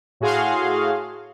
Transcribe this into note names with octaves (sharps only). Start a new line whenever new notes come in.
A2 F#4 G#4 F5 C6